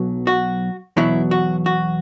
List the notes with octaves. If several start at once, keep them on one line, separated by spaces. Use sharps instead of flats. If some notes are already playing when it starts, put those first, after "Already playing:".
Already playing: B1 B2 F#3
F#4
E2 B2 F#3 E4
F#4
F#4